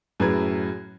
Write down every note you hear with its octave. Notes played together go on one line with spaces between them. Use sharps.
F#2 A2 G#4 B4 A#5 G#6